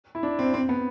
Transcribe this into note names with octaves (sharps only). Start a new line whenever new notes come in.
E4
D4
C4
C4
B3